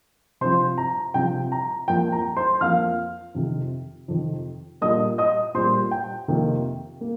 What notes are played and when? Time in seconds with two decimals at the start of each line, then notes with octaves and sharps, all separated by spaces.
0.41 C3 F3 C4 C5 C6
0.78 A#5
1.14 C3 F3 C4 G5
1.52 A#5
1.88 F2 F3 A#3 G5
2.12 A#5
2.37 C5 C6
2.61 F2 F3 A#3 F5 F6
3.35 F2 C3 D#3
4.08 F2 C3 D#3
4.81 A#2 G3 A#3 D#5 D#6
5.18 D#5 D#6
5.54 A#2 G3 A#3 C5 C6
5.91 G5
6.28 F2 C3 D#3 A#3
7.01 A#3